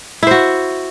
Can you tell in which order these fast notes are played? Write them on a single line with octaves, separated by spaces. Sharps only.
E4 C5 F#4